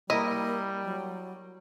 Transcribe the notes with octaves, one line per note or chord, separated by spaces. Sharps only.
G3 A#3 E4 A#4 D#5
F#3